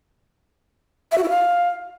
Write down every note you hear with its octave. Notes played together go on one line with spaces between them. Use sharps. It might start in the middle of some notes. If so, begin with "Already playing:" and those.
E5
F#4
E4
F5